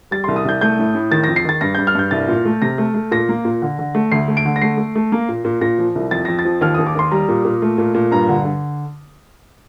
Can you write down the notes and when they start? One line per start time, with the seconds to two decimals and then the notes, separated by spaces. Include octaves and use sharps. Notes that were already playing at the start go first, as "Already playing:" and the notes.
0.11 G3 A6
0.24 C2 C6
0.36 D#6
0.45 C2 G6
0.61 A3 G6
0.79 A2
0.95 A2
1.11 D#3 A6
1.24 F2 A#6
1.36 C7
1.45 D#3 A6
1.61 G2 A#6
1.75 G2 G6
1.87 F6
1.95 G2 G6
2.11 C2 A6
2.28 A#2
2.45 A3
2.62 C3 A#6
2.78 A3
2.94 A3
3.11 A#2 A#6
3.29 A#3
3.45 A#2
3.62 D3
3.79 D3
3.95 A3
4.12 D2 C7
4.28 A3
4.37 D7
4.45 D3
4.56 A#6
4.61 A3 C7
4.78 A3
4.95 A3
5.12 A#3
5.29 A#2
5.45 A#2
5.61 A#2 A#6
5.78 F3
5.95 C2
6.11 F2 A6
6.25 F2 A#6
6.39 A6
6.45 F3
6.61 D#2 F6
6.74 D#2 D#6
6.87 D6
6.95 D#2 C6
7.11 G3 A#5
7.28 A#2
7.45 A#2
7.62 A3
7.78 A#2
7.94 A#2
8.11 G2 A#5
8.29 D3
8.45 D3